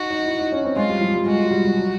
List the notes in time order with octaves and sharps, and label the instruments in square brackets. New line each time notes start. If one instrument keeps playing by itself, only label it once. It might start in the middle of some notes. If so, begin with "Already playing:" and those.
Already playing: [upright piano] D#4 [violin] F#4
[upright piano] D#4
E4
D#4
C#4
C4
[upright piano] G#3 [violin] F4
[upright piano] G3
F3
G3
[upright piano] G#3 [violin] F#4
[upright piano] F#3
G3
G3
F#3